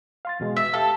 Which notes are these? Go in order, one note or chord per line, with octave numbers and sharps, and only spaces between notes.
F5 C6 A6
E2 B2 G#3
E5
G4 A4 F5